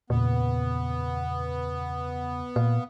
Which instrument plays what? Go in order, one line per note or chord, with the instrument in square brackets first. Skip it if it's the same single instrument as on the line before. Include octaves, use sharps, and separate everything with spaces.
[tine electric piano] E2 C#3 [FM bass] A#2 [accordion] B3
[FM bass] A#2 [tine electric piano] F5